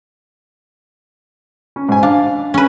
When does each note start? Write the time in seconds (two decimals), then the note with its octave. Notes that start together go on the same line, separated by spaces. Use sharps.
1.76 C#4
1.89 G#2 G#5
2.03 D4 F5
2.54 C#4 B4